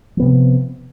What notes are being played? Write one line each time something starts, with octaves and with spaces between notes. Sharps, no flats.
C3 F3 B3